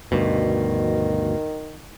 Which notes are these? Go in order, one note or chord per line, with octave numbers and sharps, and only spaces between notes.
D2 G2 B2 D#3